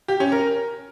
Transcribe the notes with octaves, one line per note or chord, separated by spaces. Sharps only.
G4
C#4
A#4